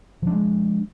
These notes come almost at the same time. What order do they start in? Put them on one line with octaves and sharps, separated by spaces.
F3 D4 G#3